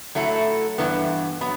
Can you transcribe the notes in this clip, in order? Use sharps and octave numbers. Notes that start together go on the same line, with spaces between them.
F#3 A3 E4
G2 E3 B3
F#3 B3